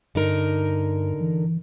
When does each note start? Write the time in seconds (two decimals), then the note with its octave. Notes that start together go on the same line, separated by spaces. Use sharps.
0.15 G2 D3 D#4 A#4
1.21 E3